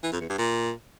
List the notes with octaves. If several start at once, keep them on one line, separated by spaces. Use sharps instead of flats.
E3
F2
E2
G2
A#2